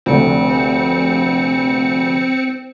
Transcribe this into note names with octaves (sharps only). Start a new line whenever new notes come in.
F1 D2 C4 C#7